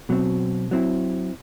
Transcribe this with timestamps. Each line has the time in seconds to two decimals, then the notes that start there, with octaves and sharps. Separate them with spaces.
0.09 B2 F#3 C4
0.71 F#3 C4 E4